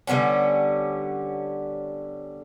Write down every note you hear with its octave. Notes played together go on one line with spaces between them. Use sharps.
D3 G3 B3 C#4